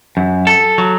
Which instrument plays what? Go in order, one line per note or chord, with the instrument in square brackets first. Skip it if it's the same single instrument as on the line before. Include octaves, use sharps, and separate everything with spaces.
[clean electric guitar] F#2
A4
F#3